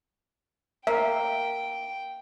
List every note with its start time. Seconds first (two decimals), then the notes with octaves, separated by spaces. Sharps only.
0.87 A#3 E5 G5